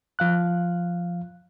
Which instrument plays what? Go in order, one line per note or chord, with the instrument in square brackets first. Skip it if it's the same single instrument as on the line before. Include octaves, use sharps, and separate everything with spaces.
[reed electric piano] F3 F5 F#6